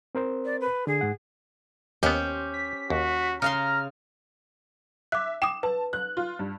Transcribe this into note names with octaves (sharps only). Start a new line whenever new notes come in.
C4 A#4 C5
D5
B4
D3 G#4
G#2 F#5
D#2 B3 C#4 G4 C5
B6
D#2 F#4
C#3 F5 A#5 C6 F6
E5 D6 F#6
G5 D6 D#6 E7
B4 A5
F#6
F4
G2